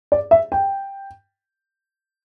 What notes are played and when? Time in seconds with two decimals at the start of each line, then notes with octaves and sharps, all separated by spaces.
0.12 D5
0.31 E5
0.52 G5